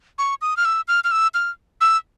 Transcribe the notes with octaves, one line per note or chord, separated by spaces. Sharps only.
C#6
D#6
F6
E6
F6
F6
E6
F6
E6